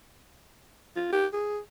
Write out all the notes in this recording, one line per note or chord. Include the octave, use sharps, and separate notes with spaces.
F4
G4
G#4